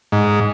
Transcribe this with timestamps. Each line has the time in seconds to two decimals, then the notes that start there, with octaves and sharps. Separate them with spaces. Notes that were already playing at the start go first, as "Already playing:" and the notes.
0.12 G#2